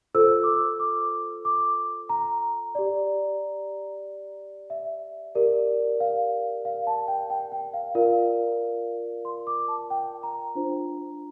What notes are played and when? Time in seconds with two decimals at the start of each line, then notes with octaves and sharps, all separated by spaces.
0.15 F4 A4 C5 E6
0.43 D6
0.47 E6
0.79 D6
1.45 D6
2.09 A#5
2.75 G4 D5
4.70 E5
5.35 G4 A#4 D5
6.00 F5
6.65 F5
6.87 A5
7.08 G5
7.30 G5
7.52 G5
7.74 F5
7.95 F4 A#4 D5 F5
9.25 C6
9.47 D6
9.68 A5
9.90 G5
10.23 A#5
10.55 D4 F4 C5